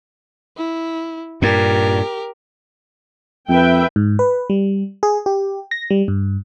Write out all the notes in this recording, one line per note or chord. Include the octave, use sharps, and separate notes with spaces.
E4
G2 A#2 G4 A#4
F2 B4 E5 G5
G#2
B4
G3
G#4
G4
A#6
G3
G2